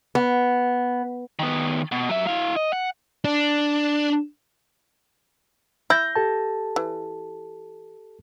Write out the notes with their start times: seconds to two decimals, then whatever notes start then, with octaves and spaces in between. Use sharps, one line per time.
0.15 B3
1.39 D#3 B3
1.92 B2
2.09 F#3 E5
2.27 E4 F5
2.56 D#5
2.73 F#5
3.25 D4
5.90 E4 G6 A#6
6.16 G4 A4 A5
6.76 E3